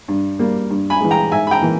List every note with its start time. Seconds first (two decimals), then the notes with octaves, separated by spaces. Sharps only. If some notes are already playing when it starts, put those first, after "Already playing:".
0.08 G2
0.39 G3 A#3
0.70 G2
0.90 G#5 B5
1.01 E3 G#3
1.11 G5 A#5
1.32 G#2 E5 G#5
1.47 B5
1.51 G5 A#5
1.61 E3 A#3